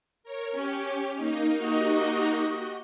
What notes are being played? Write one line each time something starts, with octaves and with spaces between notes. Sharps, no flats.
A#4 C#5
C#4 G4
A#3 D#4
F#4 G4 D#5